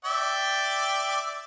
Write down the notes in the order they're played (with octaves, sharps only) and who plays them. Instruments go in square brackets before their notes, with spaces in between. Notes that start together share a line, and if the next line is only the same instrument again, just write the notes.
[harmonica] D5 E5 G5